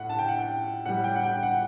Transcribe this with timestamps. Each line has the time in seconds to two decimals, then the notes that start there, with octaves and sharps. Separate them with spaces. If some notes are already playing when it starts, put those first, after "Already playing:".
Already playing: A2 A3 F#5
0.10 A5
0.19 G5
0.28 F#5
0.39 G5
0.86 A2 G3 F#5
1.04 G5
1.16 F#5
1.24 G5
1.43 F#5